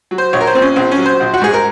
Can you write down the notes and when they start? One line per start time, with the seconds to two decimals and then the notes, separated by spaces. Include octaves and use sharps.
0.11 F#3
0.18 C5
0.33 A#1 C#5
0.41 A#4
0.47 C5
0.55 A#2 C4
0.62 C#4
0.76 A#1 C4
0.91 C#4
0.98 F#3
1.06 C5
1.20 A#1
1.34 F#4
1.41 G#2 G#4
1.54 A#4